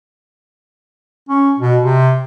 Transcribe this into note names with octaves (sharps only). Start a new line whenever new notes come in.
C#4
B2
C3